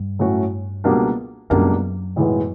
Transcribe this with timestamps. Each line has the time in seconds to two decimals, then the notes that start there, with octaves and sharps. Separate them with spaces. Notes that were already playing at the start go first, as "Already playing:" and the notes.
Already playing: G2
0.19 A2 F#3 A3 C#4 F#4
0.84 C#2 B2 G3 A#3 D4
1.50 C#2 F#2 B2 G3 A#3 D4
2.16 B1 A2 E3 G#3 B3